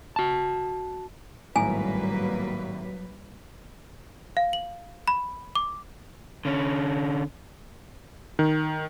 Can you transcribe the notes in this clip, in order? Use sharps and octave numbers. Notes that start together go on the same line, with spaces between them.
F#4 A5
G#1 A2 F#3 G3 A#3 B4 G#5 A#5
F5
F#7
B5
D6
D3 C#4
D#3